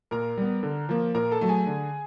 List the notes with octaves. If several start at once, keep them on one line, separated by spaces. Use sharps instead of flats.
A#2 A#4 A#5
G3 B3
D3
F3 A#3
A#2 A#4 A#5
A4 A5
F#3 A3
G#4 G#5
D3